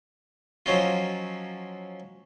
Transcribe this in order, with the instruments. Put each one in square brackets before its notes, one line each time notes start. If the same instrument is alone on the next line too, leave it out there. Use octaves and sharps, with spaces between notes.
[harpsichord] F3 F#3 C#4 D#4 F4